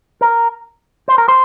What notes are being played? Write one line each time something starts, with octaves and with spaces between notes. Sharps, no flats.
A#4
C5
A#4
C5